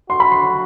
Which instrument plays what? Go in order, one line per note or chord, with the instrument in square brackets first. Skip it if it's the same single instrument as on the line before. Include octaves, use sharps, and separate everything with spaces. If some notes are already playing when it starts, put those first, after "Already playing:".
[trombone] F#4 [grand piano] C6
[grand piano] B5
C6